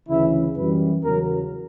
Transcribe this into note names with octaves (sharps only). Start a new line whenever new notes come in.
D2 C#3 E3 E4
F#2 E3 G3 B4
E2 C#3 F#3 A#4